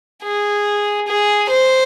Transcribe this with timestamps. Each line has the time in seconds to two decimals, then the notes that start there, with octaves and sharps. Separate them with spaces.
0.24 G#4
1.08 G#4
1.50 C5